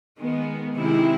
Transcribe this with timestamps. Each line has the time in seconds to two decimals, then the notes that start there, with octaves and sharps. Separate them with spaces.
0.18 D#3 G#3 B3
0.76 C3 D#3 G#3 C4 E4